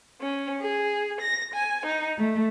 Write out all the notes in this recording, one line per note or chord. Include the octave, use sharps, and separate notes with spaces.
C#4
G#4
A#6
G#5
D#4
A3